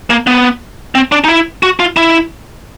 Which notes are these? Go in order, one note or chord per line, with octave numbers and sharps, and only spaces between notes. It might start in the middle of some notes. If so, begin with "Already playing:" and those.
A#3
B3
C4
D4
D#4
E4
F#4
F4
E4